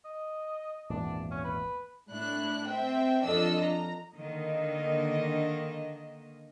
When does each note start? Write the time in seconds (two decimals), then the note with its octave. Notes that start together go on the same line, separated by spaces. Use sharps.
0.05 D#5
0.90 G#1 E2 A#2 D4
1.31 C#4
1.44 B4
2.09 A2 D4 E4 F#6
2.68 C4 E5 G5
3.24 F2 D4 F4 A4 D#5 E6
3.62 A#5
4.14 D3 D#3 A#3 D#5